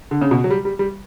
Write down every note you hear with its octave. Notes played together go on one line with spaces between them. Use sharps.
D3
C#3
B2
F#3
G3
G3
G3